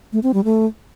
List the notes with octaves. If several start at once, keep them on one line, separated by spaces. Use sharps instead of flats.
A3
C4
G3
A3